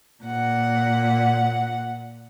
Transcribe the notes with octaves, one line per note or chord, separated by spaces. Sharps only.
A#2 F#5